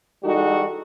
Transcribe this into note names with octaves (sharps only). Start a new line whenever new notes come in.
E3 G3 G#3 D#4 F#4 A4